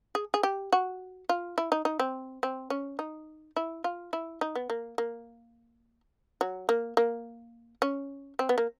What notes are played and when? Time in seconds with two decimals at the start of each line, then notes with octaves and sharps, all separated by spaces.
0.15 G#4
0.34 G#4
0.43 G4
0.73 F#4
1.29 F4
1.58 E4
1.72 D#4
1.85 D#4
1.99 C4
2.43 C4
2.70 C#4
2.99 D#4
3.56 E4
3.84 F4
4.13 E4
4.41 D#4
4.55 B3
4.70 A#3
4.98 A#3
6.41 F#3
6.69 A#3
6.97 A#3
7.82 C#4
8.39 C4
8.49 B3
8.58 A#3